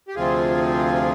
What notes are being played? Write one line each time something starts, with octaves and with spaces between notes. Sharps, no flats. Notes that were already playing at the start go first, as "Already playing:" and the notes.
G4
D2 C3 F3 C4 F4 G#4